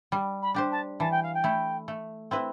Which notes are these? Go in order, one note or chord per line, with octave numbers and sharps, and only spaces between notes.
G3
B5
D4 G4 C5
A5
E3 A5
G5
F5
G5
A3 E4
A3
C4 E4 B4